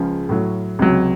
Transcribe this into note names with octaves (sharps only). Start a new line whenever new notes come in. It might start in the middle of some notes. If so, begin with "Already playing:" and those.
Already playing: C#2 C#3 F3
A2 F#3
C#2 C3 F#3